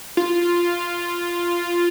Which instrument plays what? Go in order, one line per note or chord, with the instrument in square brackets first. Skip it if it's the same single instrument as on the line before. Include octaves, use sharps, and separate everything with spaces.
[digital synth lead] F4